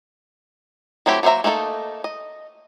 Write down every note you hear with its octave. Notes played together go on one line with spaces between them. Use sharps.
F#3 A3 C4 E4 G4
F#3 A#3 C5 E5 A#5
A3 A#3 D#4 F#4 A4
D#5